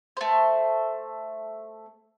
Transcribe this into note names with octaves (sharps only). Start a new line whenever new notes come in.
A3 C5